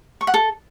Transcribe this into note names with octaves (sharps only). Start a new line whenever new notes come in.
C#6
F#5
A4